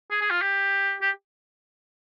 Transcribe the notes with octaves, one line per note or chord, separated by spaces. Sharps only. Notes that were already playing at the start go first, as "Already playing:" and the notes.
G#4
G#4
F4
G4
G4